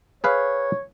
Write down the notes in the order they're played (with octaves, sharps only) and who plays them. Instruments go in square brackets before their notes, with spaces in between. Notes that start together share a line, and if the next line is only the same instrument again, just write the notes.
[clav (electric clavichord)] G#4 B4 F5 [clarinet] C#5